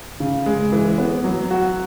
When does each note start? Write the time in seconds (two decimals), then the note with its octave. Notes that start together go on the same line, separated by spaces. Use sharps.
0.20 C#3
0.46 G#3
0.72 E3
0.98 B3
1.24 F#3
1.50 F#4